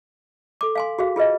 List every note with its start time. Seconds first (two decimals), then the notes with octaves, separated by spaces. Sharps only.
0.61 A4 D6
0.75 F5 G#5 C6
0.99 F#4 G#4 F5
1.16 F4 G#4 B4 D#5